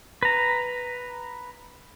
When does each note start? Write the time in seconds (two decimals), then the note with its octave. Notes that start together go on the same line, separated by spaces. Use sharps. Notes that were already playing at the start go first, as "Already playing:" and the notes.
0.23 B4 A#5